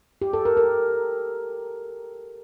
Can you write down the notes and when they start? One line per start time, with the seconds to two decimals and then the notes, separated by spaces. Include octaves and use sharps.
0.22 G4
0.33 A4
0.45 A#4
0.57 A#4